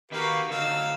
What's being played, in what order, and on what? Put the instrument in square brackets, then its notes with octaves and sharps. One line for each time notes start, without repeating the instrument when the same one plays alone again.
[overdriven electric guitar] D#3 [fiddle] A#3 F#4 [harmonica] G4 B4 F5
[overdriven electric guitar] D3 F#3 [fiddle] D#4 E6 [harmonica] F5